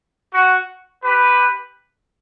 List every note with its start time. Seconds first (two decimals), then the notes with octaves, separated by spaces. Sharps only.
0.33 F#4
1.03 G4 B4